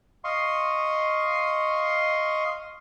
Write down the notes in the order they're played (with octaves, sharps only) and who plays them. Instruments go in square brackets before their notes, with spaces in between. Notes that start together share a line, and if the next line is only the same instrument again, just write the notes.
[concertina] D#5 F5 C6 C#6